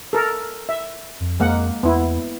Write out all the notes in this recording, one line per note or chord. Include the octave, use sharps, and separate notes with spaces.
A4 A#4
E5
F2
F2 G#3 A#3 F#5
E2 B3 E4